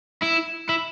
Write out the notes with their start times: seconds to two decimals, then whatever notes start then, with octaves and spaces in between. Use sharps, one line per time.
0.22 E4
0.69 E4